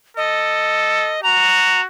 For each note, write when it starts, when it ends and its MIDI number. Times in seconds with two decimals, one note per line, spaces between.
0.17 1.16 69
0.17 1.20 75
1.23 1.86 66
1.23 1.81 82